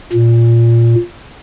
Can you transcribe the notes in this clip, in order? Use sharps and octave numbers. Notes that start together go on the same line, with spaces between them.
A#2